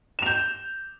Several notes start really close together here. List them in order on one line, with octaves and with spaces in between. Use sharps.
E7 F7 G6